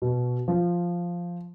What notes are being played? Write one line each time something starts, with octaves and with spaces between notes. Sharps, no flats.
B2
F3